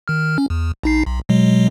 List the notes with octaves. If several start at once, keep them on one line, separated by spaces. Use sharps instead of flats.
D#3 F6
C#4
E2
A#1 D#4 C7
B1
B2 F#3 G#3